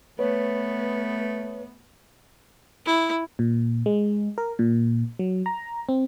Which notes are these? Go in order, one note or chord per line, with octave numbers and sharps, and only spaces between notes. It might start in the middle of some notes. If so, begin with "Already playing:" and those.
A3 B3 B4 C#5
E4
A#2
G#3
A#4
A#2
F#3
A#5
C4